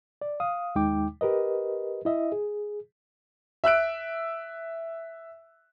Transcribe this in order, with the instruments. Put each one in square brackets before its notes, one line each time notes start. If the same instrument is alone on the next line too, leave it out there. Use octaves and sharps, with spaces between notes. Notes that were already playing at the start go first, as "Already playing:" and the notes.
[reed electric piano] D5
F5 D#6
D#2 G#3 D#4 G5 D6
G4 A#4 B4 D#5
E4 D#5 E5
G#4
[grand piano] E5 E6 F#6 D7